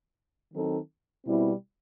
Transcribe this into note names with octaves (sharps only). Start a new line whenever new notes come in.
D#3 F#3 C4 D#4 A4
B2 G3 C4 E4